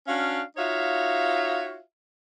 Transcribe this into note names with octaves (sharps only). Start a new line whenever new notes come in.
C#4 D4 F#4 F5
D#4 F4 F#4 C#5 E5 F5